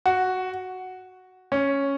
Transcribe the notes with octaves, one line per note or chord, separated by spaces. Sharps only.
F#4
C#4